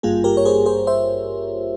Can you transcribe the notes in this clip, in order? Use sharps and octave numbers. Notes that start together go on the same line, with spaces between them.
G#1 G2 G3 A#3 F4 G#4
G4 A#4
C#5
G#4 C5
G#4 C5
C5 E5